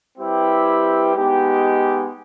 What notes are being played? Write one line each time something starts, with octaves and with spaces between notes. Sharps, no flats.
G3 C4 E4 G4 B4
G#3 B3 D#4 G4